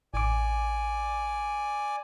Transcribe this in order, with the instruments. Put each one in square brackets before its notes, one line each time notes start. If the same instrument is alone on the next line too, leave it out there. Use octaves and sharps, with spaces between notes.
[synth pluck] A1 D6 [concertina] D5 G#5